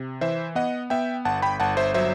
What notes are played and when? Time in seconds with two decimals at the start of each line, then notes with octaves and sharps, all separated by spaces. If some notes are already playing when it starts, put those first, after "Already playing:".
Already playing: C3
0.21 E3 C5 E5
0.55 B3 D#5 F#5
0.90 B3 E5 G5
1.25 G1 F#5 A5
1.42 G5 B5
1.60 G1 F#5 A5
1.77 C5 E5
1.94 F#3 C5 E5